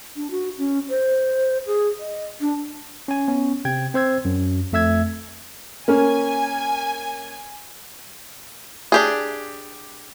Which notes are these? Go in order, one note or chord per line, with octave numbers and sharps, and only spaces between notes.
D4
F#4
C#4
C5
G#4
D#5
D4
C#4 G#5
B3 C#4
C3 G5 G#6
C4 C5 E6 G#6
F#2
F2 A3 E5 E6 G#6
A#3 C#4 G#5
D4 G4 G#4